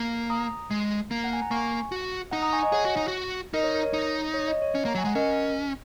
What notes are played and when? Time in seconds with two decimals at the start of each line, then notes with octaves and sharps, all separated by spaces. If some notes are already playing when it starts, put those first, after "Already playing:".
Already playing: A#3
0.30 A#5 D#6
0.71 G#3
1.11 A#3
1.24 F#5
1.33 G#5
1.42 A#5
1.51 A#3 G#5 C#6
1.92 F#4
2.32 D#4 F#5 A#5
2.42 A#5 D#6
2.53 G#5 C#6
2.63 D#5 G#5
2.72 G#4 C#5 F#5
2.85 F#4
2.97 D#4
3.08 F#4
3.54 D#4 A#4 D#5
3.64 C#5
3.74 A#4
3.84 C#5
3.93 D#4
4.34 C#5
4.48 D#5
4.62 C#5
4.75 C#4
4.85 A#3
4.88 A#5
4.95 F#3
4.98 G#5
5.05 G#3 F#5
5.15 C#4 A#4 D#5